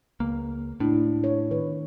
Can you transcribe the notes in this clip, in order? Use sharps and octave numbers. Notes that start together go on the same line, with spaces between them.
C#2 A#3
A2 D4 E4
C#5
D#3 B4